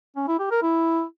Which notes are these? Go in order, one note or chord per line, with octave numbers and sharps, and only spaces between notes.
C#4
E4
G4
A#4
E4